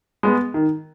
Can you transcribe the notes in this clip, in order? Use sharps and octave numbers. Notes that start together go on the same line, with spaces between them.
G#3 B3
D#3